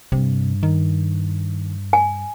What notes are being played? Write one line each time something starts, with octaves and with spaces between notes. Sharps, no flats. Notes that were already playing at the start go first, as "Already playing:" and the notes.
G2 C3
D#3
G#5